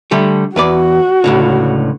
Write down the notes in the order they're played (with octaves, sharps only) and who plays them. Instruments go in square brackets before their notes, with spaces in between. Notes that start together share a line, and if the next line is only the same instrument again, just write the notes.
[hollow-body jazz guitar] D3 G3 A3
[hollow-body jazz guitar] E2 B4 D5 [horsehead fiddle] F#4
[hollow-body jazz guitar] C#2 A2 D3